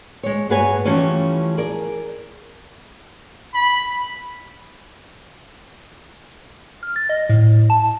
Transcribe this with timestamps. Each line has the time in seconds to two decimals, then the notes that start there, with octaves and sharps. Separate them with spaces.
0.23 G#3 C#5
0.50 G2 F#4 G#4 B4 C#5 G#5
0.85 E3 F3 G3 A3 C#4
1.57 G#4 A#4 D5
3.53 B5
6.83 F6
6.96 A6
7.09 D#5
7.29 A2
7.70 A5